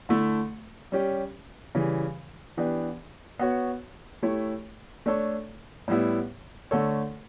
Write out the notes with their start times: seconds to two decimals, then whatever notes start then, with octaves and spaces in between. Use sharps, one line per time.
0.09 D3 A3 E4
0.92 G3 C#4 G4
1.75 C#3 E3 G3
2.57 E3 B3 D4 G4
3.39 B3 F#4 C#5
4.23 A3 E4 G4 C#5
5.06 A3 D4 A4 C#5
5.88 A2 G3 B3 E4
6.71 D3 A3 D4 A4 C#5